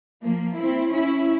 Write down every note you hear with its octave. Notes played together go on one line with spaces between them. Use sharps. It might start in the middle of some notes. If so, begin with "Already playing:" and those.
F3 A#3
C4 E4
C#4 E4